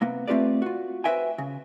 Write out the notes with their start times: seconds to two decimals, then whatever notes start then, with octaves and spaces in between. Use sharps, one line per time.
0.01 C3 A#3 B3
0.28 A3 C4 F4 G4 B4 D5
0.62 F4 F#4
1.04 F#4 B4 C5 E5 G5 G#5
1.38 C#3